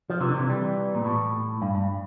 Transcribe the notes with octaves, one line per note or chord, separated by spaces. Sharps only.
F3
C3 E3
D3
C3 E3
E3 G3
A#2
A2
G2
G2